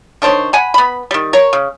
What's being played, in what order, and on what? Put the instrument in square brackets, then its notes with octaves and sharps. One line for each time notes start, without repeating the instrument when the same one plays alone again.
[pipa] D#3 D4 C5 C#5
F#5 G#5 B5
B3 B5
D#3 G3
A#4 C#5
C#3